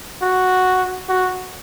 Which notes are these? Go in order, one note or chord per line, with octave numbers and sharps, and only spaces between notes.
F#4
F#4